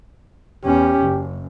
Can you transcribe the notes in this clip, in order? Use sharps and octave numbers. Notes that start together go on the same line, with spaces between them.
E2 C#4 G4
F#1